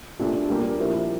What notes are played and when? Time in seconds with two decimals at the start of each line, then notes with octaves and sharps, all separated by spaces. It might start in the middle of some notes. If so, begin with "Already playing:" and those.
0.20 A#2 A3 D4 G4
0.49 A#2 G3 A#3 D4 G4
0.79 F3 A#3 E4 G4